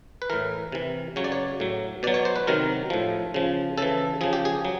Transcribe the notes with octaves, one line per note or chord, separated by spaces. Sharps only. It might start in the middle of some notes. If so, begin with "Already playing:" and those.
B4
A2 E3 A#4
C3 E3
C#3 F#3 C#5
D5
C#5
A2 F#3
B2 F#3 D5
C#5
C5
B4
C3 D#3 F#3 A#4
A2 F3
C#3 F3
C#3 E3 A4
C#3 F3 G#4
G4
G#4
F#3